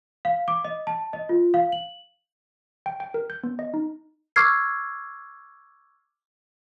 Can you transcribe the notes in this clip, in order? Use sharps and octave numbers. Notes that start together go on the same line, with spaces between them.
F5
D6
D#5
A5
D#5
F4
F5
F#7
G5
G5
A#4
G6
B3
D#5
D#4
C#6 D6 E6 F6 G#6 C7